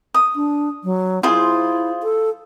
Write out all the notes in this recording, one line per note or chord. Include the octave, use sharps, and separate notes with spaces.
D#6
D4
F#3
E4 F4 G#4 C5
A4